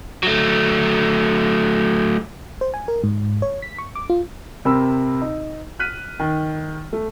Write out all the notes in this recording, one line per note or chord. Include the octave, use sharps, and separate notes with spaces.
F#3 A3
C5
G#5
A#4
G#2
C#5
B6
C#6
D6
F4
C3 C4 A#4 B5 E6
D#4
F6 F#6 B6 D#7
D#3
A3